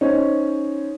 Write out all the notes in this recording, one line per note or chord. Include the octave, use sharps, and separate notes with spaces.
C#4 D#4 C5 C#5